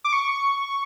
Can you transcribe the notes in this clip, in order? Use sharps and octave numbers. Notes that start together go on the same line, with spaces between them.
D6
C#6